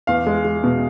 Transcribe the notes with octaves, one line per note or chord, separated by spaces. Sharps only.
E2 F5
G#3
G#3
B2